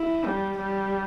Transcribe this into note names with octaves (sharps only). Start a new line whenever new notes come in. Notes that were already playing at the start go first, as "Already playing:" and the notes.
Already playing: E4
G3
G3